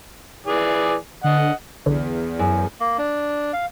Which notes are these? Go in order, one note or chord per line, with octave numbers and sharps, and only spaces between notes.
E3 G#4 D5
D3 D#5 F#5
B1 E2 D3
F#2
A#3
D4
F5